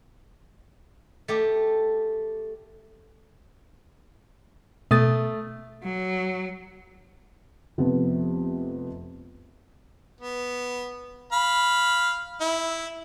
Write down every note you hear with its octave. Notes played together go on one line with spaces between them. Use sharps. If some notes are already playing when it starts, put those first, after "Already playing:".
A3 G4
B2 A3 D#6 A6
F#3
F1 F2 C3 B3
B3
F5 B5
E4